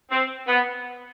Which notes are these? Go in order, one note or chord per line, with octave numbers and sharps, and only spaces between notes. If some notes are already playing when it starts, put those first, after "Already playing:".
C4
B3